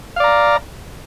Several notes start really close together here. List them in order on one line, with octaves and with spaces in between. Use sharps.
F5 D5 A#5